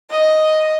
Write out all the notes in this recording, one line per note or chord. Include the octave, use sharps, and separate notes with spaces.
D#5